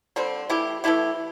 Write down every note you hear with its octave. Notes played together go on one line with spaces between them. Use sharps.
D3 G3 C4
E3 A3 E4 G4
E3 A3 E4 G4